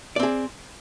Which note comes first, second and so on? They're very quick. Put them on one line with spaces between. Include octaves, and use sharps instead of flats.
D5 C4 G#4